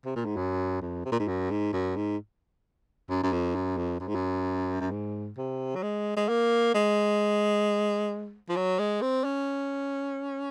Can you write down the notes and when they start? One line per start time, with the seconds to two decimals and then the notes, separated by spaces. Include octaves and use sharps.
0.05 C3
0.16 A#2
0.26 G#2
0.37 F#2
0.82 F2
1.06 C3
1.12 A#2
1.20 G#2
1.28 F#2
1.51 G#2
1.73 F#2
1.96 G#2
3.10 F#2
3.23 F#2
3.33 F2
3.55 F#2
3.77 F2
4.00 F#2
4.08 G#2
4.15 F#2
4.81 F#2
4.91 G#2
5.37 C3
5.75 F#3
5.83 G#3
6.17 G#3
6.29 A#3
6.74 G#3
8.49 F3
8.57 F#3
8.79 G#3
9.02 C4
9.24 C#4